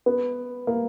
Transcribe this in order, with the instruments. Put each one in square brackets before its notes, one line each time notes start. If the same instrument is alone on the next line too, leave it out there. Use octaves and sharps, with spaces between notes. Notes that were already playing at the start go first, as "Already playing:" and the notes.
[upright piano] B3
A#3